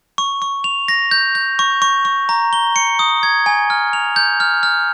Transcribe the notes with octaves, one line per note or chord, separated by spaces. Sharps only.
C#6
C#6
F7
A#6
G6
G6
C#6
C#6
C#6
A#5
G7
C#7
D#6
G#6
G#5
F6
F7
G6
F6
F6